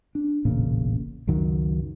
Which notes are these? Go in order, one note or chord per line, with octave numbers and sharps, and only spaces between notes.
D4
E1 A1 A#2 C#3
C#2 F#2 D#3 F#3